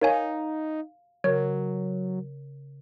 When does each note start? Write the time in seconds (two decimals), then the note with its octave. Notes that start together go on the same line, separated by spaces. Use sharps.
0.02 D#4 A#4 C#5 F5 G#5
1.24 C#3 F#3 A#4 C#5